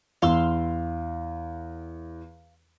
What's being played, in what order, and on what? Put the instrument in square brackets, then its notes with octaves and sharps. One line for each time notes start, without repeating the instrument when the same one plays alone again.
[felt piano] E2 [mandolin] F5 C6 E6